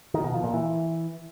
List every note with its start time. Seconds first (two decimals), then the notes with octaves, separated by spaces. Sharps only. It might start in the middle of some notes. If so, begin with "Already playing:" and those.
0.14 D#3
0.24 B2
0.34 F3
0.44 A#2
0.54 E3